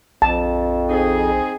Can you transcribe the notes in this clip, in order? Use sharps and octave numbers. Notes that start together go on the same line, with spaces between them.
A#1 F2 A5
C4 D#4 G#4